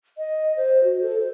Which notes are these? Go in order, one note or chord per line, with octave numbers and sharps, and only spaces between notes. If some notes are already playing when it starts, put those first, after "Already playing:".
D#5
C5
F#4
A4
C5